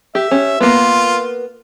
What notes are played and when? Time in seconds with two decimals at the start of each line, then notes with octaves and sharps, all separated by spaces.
0.15 G4 E5
0.31 C#4 G4
0.60 A#3 B3 F4